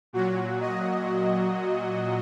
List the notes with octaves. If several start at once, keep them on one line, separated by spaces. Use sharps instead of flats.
A#2 F#3 F#4
D#5